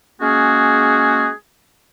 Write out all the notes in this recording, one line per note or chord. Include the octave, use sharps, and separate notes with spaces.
G#3 A#3 C#4 F#4 G#4